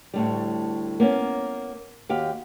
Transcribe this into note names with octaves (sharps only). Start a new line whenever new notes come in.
D2 A2 G3
A#3 B3 C#4
D#2 F#4 G4 F5